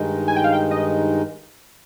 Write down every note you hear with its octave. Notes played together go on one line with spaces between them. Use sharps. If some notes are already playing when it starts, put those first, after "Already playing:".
Already playing: G2 D#3 G#3 D#4
G#5
G5
F5
G5
D#5